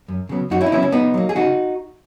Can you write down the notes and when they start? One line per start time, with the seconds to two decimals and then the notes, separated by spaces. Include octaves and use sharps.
0.08 F#2
0.29 C#3 F#3 B3
0.50 F#2 D#4 F#4
0.61 C#4 E4
0.66 D#4
0.72 C#3 F#3 B3 C#4 E4
0.83 C#4
0.92 C#3 B3 D#4
1.14 F#3 A#3
1.29 G#4
1.36 C#3 D#4 F#4